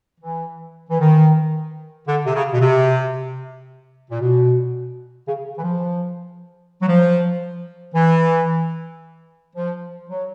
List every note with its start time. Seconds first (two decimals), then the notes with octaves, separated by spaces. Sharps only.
0.20 E3
0.89 E3
1.00 D#3
2.07 D3
2.26 C3
2.34 C#3
2.53 B2
2.60 C3
4.10 A#2
4.20 B2
5.27 C#3
5.58 E3
5.63 F3
6.82 F#3
6.88 F3
7.94 E3
9.55 F3
10.08 F#3